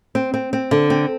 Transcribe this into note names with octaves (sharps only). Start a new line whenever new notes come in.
C4
C4
C4
D3
C4